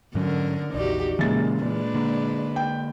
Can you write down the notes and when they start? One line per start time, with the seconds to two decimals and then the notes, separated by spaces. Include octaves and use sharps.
0.15 G#2 D3 F#3 C#4 A#4
0.74 A#1 E2 D#4 F#4 G4 D5
1.19 A#2 C#3 E3 G#3 A#3 A6
1.62 A#2 G#3 D4 B4
1.94 D3 A#3
2.56 G5